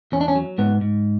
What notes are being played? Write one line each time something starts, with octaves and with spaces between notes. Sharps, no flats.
E2 C#4
D4
C#4
F#3
G#2 B3
G#2